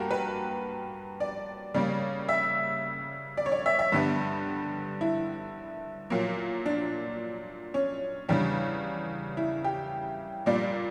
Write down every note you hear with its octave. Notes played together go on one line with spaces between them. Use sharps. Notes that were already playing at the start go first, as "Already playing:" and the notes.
Already playing: G2 A#3 F#4 G4 A#4
B4
D5
C#3 G3 A#3 D5
E5
D5
C#5
D5
E5
E5
G2 D3 G3 B3
E4
A#2 F#3 A#3
D4
C#4
E2 C#3 G3 D4
E4
G4
A#2 G3 A#3 D5